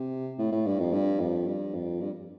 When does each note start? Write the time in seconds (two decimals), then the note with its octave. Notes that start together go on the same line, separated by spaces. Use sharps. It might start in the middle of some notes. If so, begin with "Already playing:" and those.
Already playing: C3
0.38 A2
0.52 A2
0.66 G2
0.79 F2
0.92 G2
1.20 F2
1.47 G2
1.74 F2
2.01 G2